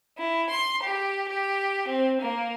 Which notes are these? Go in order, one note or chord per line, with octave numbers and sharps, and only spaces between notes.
E4
C6
G4
G4
C4
A#3